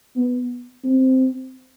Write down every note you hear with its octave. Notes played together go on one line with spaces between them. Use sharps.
B3
C4